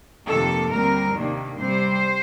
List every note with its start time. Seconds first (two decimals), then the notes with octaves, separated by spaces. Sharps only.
0.27 F2 C3 D#3 A#3 A4
0.70 D#2 D3 G3 C4 A#4
1.14 C3 D#3 A#3 D4
1.57 C3 G3 C4 C5